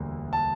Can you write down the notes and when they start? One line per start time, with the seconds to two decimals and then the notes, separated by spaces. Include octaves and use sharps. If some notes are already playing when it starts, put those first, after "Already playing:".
Already playing: E1 D2 D3 G3 A#3
0.33 A5